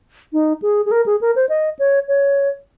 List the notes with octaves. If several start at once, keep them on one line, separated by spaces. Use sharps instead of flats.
D#4
G#4
G#4
A#4
G#4
A#4
C5
D#5
C#5
C#5